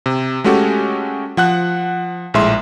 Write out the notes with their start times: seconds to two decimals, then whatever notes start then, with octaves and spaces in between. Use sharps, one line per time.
0.06 C3
0.44 G#3 A3 C#4 F#4 G4 A4
1.37 F3 F#5 F#6
2.34 A#1 A2 G#3 E5 C6